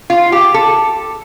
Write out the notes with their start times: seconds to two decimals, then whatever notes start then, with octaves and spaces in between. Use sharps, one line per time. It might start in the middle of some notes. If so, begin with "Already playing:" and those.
0.10 F4
0.32 G4
0.54 A4